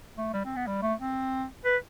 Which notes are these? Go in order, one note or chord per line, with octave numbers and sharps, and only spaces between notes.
A3
G3
C4
B3
G3
A3
C4
B4